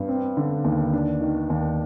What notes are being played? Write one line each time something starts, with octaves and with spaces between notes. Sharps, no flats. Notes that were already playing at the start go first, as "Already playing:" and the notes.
Already playing: G2
C4
D3
D#2
D4
D#3
D#2